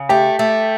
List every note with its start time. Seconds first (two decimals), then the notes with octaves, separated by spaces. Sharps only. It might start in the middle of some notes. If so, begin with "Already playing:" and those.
Already playing: C#3
0.09 A3 G4
0.39 A3